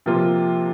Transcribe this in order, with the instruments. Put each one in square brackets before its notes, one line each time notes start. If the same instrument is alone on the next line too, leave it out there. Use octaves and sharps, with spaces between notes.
[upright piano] C3 F3 A#3 F4